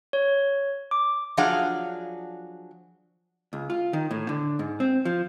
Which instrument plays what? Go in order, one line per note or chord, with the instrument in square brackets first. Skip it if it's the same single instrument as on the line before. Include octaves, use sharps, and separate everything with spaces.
[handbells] C#5
D6
[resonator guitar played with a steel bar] F3 F#3 D4 G#4 F5 F#5
[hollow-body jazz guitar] C#2
F4
D#3
A2
D3
G#2
C4
F3